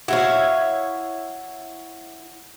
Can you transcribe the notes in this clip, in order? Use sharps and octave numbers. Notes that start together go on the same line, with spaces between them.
E4 F#4 C#5 E5 F5